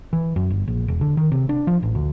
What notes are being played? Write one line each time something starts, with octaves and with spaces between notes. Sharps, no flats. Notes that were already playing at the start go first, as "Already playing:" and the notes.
E3
F#2
G1
A#1
E1
D3
D#3
C3
D4
F3
A1
D2